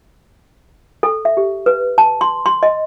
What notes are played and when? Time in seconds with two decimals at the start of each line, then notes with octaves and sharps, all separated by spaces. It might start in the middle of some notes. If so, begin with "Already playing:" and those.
1.03 A4
1.25 E5
1.37 G4
1.66 B4
1.98 A5
2.21 C6
2.46 C6
2.63 D#5